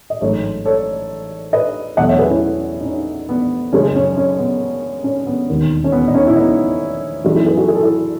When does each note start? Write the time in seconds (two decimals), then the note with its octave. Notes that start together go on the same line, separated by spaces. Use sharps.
0.10 D#5
0.21 A1 G#2 F#3 A3 A4 C#5
0.65 A4 C#5
1.53 B4 D#5
1.97 E2 B2 F#3 A3 D#5 F#5
2.08 C#5 E5
2.19 G#4 B4
2.30 C#4 E4
2.81 D#4
2.85 C#4
3.29 B3
3.73 F#1 F#2 C#3 G#3 C#4
3.95 C#4
4.17 C#4
4.38 B3
5.04 C#4
5.27 B3
5.49 E1 D#2 D#3
5.84 C#4
5.92 B3
6.08 D#4
6.15 C#4
6.27 E4
6.36 B3 D#4
7.24 F#2 E3 G#3 B3 D#4 F#4
7.36 E4 G#4
7.46 G#4 B4
7.57 F#4 A4
7.68 G#4
7.75 A4
7.82 E4 G#4